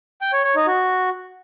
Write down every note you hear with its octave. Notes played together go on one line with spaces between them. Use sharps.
G5
C#5
C#5
D#4
F#4